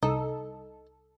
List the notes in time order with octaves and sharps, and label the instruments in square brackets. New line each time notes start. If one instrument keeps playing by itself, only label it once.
[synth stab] C2 A4 [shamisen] D#4